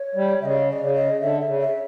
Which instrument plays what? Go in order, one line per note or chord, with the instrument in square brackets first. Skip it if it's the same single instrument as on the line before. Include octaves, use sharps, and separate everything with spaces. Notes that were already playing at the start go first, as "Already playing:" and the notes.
Already playing: [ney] C#5
[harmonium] G3
[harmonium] C#3 [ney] E5
[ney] D#5
D#5
D5
[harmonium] C#3
[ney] D#5
[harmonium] D3 [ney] E5
[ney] E5
[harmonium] C#3
[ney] E5